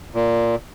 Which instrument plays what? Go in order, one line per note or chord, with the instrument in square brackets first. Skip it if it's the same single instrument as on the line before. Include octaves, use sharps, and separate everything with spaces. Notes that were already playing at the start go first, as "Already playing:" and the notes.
[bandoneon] A#2